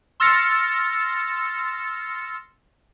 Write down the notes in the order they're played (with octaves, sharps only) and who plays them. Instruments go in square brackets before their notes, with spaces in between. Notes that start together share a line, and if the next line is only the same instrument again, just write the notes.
[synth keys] C6 E6 F6 A6 A#6 C#7